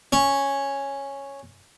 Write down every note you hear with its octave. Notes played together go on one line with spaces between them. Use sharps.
C#4